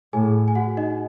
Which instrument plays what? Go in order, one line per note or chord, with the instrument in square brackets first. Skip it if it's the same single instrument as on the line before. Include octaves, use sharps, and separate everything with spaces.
[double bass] A2 [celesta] G#4 G#5
[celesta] G#5
F#4 F#5
D#4 D#5